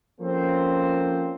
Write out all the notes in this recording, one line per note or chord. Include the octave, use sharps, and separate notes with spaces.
F3 A#3 C4 C#4 A4 C5